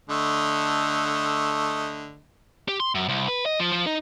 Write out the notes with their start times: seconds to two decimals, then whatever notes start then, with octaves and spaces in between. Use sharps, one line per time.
0.10 D3 A3 D#5
2.68 G4
2.80 C6
2.95 F#2
3.08 C2
3.28 B4
3.46 D#5
3.60 F3
3.73 F3
3.86 D#4